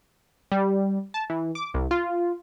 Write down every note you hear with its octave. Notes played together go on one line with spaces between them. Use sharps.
G3
A5
E3
D6
C2
F4